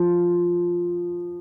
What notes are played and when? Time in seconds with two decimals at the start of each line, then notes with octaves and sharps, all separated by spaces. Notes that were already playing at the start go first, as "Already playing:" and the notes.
Already playing: F3